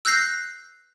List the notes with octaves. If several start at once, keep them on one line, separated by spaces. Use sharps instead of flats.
E6 F#6 G6 A#6 C7